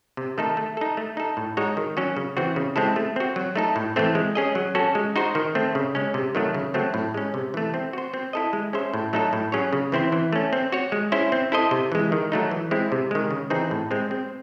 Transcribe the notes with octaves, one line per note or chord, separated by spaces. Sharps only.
C3
D#3 A3 D#4 A4
A3
D#4 A4
A3
D#4 A4
A2
G#3 D#4 F#4 C#5
D#3
F#3 C#4 F#4
C#3
E3 C4 F#4
C#3
G#3 C4 E4 A4
A3
C4 F#4
F#3
A3 D#4 A4
A2
E3 A3 C4
G#3
C#4 G#4 D#5
F#3
C#4 F#4 A4
G#3
D#4 F#4 C5
D#3
A3 C4
C#3
G#3 C#4
C3
D#3 F#3 A3
C#3
F#3 A3 C4
A2
G#3 C#4
C3
E3 A3
C4
F#4 C5
C4
E4 A4 D#5
G#3
C#4 G#4 C5 E5
A2
F#3 A3 D#4 A4
A2
F#3 C#4 G#4 C#5
C#3
E3 C4 E4 C5
E3
A3 C#4
C4
F#4 C#5
G#3
C#4 E4 C5 E5
C4
E4 A4 C5 D#5
C3
E3 G#3
D#3
F#3 A3 D#4
E3
G#3 C4 E4
C3
D#3 G#3
C#3
E3 C4 D#4 G#4
A2
G#3 C4
C4